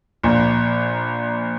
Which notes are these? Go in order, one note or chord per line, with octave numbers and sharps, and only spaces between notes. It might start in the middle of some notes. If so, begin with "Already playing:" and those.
A#1 A#2